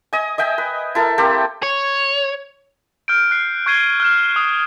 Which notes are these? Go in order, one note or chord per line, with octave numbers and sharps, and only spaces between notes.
D#5 G#5
D#5 E5 G5 G#5
B4
E4 A4 A#4
A#3 C4 G4 A4
C#5
F6 G6 D7
F#6 C7
C#6 F#6 G#6 C7 D#7 G7
F6 F#6 E7
D#6